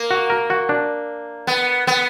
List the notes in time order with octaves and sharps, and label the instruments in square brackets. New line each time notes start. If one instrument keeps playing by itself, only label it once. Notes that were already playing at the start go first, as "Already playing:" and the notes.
Already playing: [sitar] A#3
[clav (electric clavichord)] F#4
A#4
F#4
D4
[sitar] B3
B3